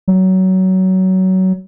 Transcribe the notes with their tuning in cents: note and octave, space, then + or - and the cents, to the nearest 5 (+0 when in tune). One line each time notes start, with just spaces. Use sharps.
F#3 +20